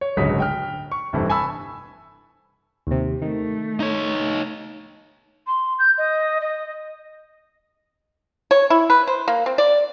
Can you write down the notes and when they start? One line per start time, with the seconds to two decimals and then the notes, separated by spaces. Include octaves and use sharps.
0.01 C#5
0.17 D1 G1 C#2 F#3 G#4 B6
0.40 G5 F6
0.92 C#6
1.13 F1 G2 E3 C4 E4 A4
1.30 G#5 A5 B5 C#6 E6
2.87 D#2 C3
3.22 D#3 A3
3.80 D#4 C#5
5.46 C6
5.78 G6
5.98 D#5
6.41 D#5
8.51 C#5
8.70 E4
8.90 B4
9.07 C5
9.28 A#3
9.46 C4
9.58 D5